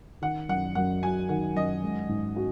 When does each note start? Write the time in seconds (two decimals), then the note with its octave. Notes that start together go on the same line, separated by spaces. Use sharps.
0.22 D#3 F#5
0.49 F#2 F#5
0.75 F#2 F#5
1.02 F#3 G#5
1.29 D#3 F#5
1.55 F#2 D#5
1.82 G#3
2.09 G#2
2.36 F#4